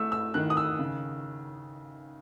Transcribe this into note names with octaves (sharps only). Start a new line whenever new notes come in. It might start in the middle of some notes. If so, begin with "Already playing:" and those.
Already playing: A3 E6
E6
D#3 F#6
D#6
E6
C#3